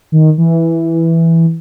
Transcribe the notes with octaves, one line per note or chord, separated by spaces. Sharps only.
D#3
E3